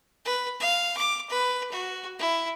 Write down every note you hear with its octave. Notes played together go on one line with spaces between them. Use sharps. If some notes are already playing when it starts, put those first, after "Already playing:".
B4
F5
D6
B4
F#4
E4